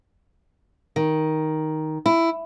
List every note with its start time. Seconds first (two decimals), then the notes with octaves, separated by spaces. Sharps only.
0.96 D#3
2.06 E4